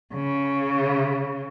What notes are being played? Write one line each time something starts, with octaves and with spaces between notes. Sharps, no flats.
C#3